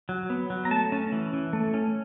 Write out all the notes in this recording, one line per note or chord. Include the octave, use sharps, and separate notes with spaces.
F#3
B3
F#3
A#5
A3 A5
C#4
E3
E3
A3
C#4